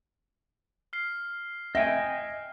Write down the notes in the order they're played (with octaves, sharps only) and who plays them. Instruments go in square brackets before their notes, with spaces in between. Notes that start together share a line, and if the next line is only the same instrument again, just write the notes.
[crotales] F6 C7
[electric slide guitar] D#5 G5 G#5 [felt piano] E5